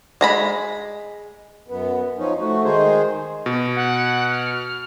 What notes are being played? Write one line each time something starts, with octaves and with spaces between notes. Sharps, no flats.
G#3 A#5 B5
F#2 B3
F3 C#4 D#4
A3 F#4
D#3 G#3 D#4 G#4 C5
B2
F#5
F6